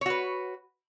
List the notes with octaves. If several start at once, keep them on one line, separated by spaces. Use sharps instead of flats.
F#4 B4 C#5